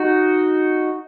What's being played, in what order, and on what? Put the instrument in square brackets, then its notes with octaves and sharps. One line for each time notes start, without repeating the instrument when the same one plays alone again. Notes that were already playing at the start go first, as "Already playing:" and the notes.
Already playing: [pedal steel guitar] D#4 F#4